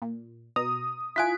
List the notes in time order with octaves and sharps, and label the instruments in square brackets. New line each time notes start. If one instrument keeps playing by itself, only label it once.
[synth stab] A#2
[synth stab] B2 A#5 [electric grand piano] D#6
[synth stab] E4 F4 D7 [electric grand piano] G#5 F#6 B6